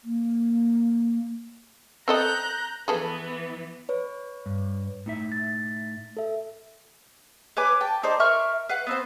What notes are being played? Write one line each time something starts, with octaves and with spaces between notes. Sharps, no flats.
A#3
C4 A4 D#5 A#5 F#6 G6
E3 B3 G#4 A4 B4
B4 C#5
G2
A2 D#4 E5
A6
A4 E5
B4 C#5 G#5 D6
G5 A5
D#4 C5 D5
A#4 E5 C#6 F6
B4 F5 F#5
B3 C4 C5